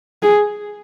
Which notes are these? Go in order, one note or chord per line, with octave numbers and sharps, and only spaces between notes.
G#4